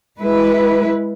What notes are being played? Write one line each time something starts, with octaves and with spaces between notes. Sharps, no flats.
G#3 E4 B4